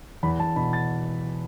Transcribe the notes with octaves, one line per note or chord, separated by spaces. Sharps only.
E2 B5
E2 A5
B2 B5
A6